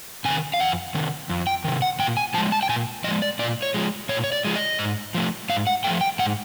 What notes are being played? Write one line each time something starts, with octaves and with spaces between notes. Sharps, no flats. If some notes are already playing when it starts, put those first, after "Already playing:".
C3 D#3 G#5
F5
F2 F#5
C3 D#3
F2
G5
C3 D#3
F#5
A#2 G5
G#5
F3 G#3 A5
A5
G5
A#2 G#5
F3 G#3 D#5
D5
A#2 D5
C#5
F3 G#3
A#2 C#5
C#5
D5
F3 G#3
D#5
G#2
F3 A3
G#2 F5
F#5
F3 A3 G5
G5
G#2 F#5